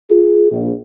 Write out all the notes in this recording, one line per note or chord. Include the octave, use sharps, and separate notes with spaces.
F4 G#4
A#1